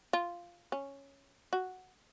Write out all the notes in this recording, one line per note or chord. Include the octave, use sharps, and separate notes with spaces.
F4
C#4
F#4